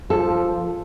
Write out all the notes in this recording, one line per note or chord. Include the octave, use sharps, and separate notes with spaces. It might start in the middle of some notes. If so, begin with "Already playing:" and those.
F3 A4